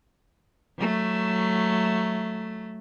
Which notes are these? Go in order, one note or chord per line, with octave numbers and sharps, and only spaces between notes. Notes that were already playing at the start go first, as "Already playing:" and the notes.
F#3 A3